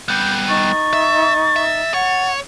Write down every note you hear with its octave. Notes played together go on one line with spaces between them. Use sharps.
G3 B3 G6
D#4 C#6 A6
E5
E5
C#5 F#5